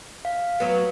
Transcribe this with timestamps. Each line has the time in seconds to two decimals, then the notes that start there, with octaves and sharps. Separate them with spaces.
0.25 F5
0.60 F#3 B3